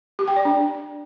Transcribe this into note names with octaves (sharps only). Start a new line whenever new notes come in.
G4
G5
D5
D4